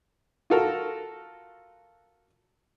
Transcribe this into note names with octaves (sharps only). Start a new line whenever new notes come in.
F4 F#4 A4 A#4